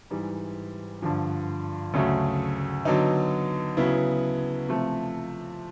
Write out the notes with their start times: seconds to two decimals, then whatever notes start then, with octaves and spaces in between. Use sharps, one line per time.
0.10 G#2 E3 G3
1.02 G2 D3 F3
1.94 D2 C#3 F#3 A3
2.85 D3 F#3 B3 D#4
3.77 C#3 F#3 B3 E4
4.69 C3 F3 A3